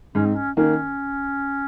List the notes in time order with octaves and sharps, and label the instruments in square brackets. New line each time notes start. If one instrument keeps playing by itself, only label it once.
[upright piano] G#2 [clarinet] C#4
[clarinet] C4
C#4
[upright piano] D#3 A#3 [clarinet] C#4